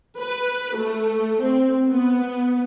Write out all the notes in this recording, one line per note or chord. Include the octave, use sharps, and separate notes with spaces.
B4
A3
C4
B3